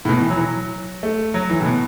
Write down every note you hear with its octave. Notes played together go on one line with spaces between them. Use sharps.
A2
B2
E3
F#3
E3
F#3
A3
F#3
E3
A2
B2